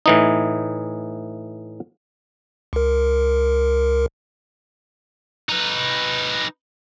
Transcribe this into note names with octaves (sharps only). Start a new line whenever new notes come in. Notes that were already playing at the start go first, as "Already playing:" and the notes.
A2 E3 D#4
C#2 A#4
D#4 B4